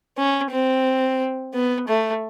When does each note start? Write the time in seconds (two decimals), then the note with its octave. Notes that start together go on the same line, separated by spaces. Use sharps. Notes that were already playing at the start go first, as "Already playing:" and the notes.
0.18 C#4
0.51 C4
1.54 B3
1.88 A3